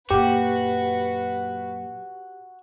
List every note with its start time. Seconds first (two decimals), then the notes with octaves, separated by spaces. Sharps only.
0.11 F#2 A#2 F#4 G4 B4